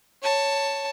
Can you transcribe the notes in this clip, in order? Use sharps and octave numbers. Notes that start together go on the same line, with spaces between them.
C#5 A5